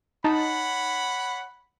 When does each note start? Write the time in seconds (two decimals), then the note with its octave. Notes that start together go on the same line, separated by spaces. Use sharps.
0.24 D#4 C#5 F#5 A5 B5